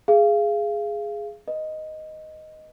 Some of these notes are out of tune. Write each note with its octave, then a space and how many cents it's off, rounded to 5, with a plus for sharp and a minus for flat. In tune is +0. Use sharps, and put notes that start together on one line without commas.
G#4 +0 F5 -25
B4 +0 D#5 +0